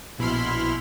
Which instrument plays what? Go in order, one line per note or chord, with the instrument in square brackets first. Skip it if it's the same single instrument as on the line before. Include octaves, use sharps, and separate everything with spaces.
[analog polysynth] A#1 B2 E4 B5 C6 F6